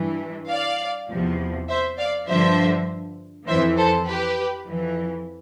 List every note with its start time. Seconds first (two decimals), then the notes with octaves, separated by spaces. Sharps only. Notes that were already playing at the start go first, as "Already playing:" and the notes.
Already playing: G2 E3
0.50 D5 F5
1.09 E2 C3 F3
1.69 C5 E5
1.98 D5 F5
2.28 G2 D3 F3 C5 E5
3.47 F2 E3 C5 E5
3.77 A4 C5
4.07 G4 B4
4.66 F2 E3